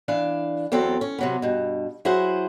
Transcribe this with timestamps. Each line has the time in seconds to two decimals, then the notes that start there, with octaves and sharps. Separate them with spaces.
0.08 E3 D4 F5
0.72 E2 F#3 C4 A4
1.01 C#4
1.18 C3 F#3 B3
1.42 G2 B2
2.05 F#3 E4 G#4 C5 F#5